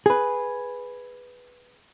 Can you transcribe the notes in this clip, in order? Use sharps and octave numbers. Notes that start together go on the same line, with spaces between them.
G#4 B4